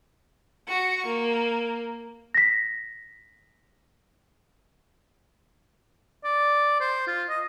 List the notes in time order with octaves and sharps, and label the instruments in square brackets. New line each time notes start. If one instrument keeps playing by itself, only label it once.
[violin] F#4 C#6
A#3
[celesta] A#6 B6
[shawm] D5
C5
F4
D#5